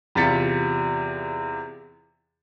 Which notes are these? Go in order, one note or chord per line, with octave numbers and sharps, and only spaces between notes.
E2 C3 F4 A6 B6 C#7